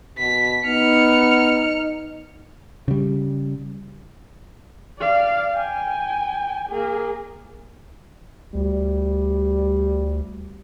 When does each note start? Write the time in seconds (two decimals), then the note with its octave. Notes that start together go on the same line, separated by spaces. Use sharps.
0.18 B2 B6
0.66 B3 D#4 F6 C#7
2.88 C#3 G3
4.99 D5 F5
5.55 G5 G#5
6.70 A#3 G#4
8.55 D2 G3